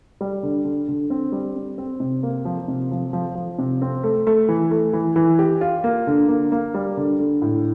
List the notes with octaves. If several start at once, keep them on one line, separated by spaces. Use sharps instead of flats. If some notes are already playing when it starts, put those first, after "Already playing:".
G3
D3
D3
D3
C4
G3
C4
C4
C3
A#3
F3
C3
F3
F3
F3
C3
C4
A3
A3
E3
A3
E3
E3
G4
F4
A#3
D3
A#3
A#3
G3
D3
D3
A2